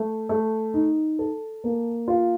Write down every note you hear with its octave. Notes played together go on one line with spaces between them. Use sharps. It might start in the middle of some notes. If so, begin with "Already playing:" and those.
Already playing: A3
A3
D#4
A4
A#3
F4